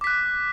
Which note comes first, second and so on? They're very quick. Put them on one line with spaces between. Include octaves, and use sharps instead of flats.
D6 B6 F#6